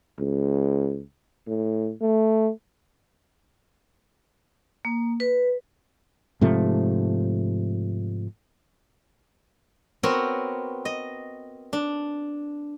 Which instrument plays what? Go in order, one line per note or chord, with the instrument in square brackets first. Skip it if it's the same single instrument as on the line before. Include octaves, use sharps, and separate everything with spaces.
[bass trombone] C#2
A2
A3
[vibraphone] A#3
B4
[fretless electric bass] G#2 C3 F3 A3
[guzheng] B3 C4 F#4 A#4 C#5
D#5
D4